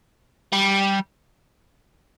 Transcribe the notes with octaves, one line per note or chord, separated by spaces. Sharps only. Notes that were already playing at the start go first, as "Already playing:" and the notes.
G3